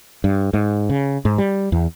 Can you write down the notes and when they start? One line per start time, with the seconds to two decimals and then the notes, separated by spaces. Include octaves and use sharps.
0.24 G2
0.54 G#2
0.90 C#3
1.25 G#2
1.38 G3
1.72 E2